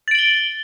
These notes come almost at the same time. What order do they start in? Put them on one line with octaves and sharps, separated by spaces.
A6 D7 F#7 G7